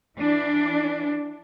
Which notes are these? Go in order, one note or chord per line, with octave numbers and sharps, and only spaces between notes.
E3 D4